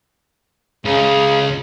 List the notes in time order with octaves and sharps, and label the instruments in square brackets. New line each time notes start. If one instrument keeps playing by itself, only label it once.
[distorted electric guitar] C#2 [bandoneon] C#3